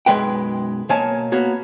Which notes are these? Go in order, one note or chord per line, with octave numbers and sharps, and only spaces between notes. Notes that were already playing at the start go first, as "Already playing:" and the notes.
B1 F#2 A#2 G#3 B4 G5
B2 A#3 C#5 G#5 A5
A#3 B3 F#4 C#5